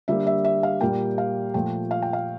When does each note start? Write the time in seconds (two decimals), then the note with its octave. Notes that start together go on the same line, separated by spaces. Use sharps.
0.08 D3 G3 A#3 E5
0.27 E5
0.45 E5
0.63 F5
0.81 A#2 G3 A#3 G5
1.18 F5
1.54 A#2 F3 A3 G5
1.91 F5
2.02 G5
2.13 F5